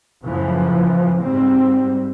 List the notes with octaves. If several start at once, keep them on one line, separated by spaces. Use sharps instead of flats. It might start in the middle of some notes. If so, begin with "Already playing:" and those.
F#2 A2 C#3 E3 F3
G#2 G3 C4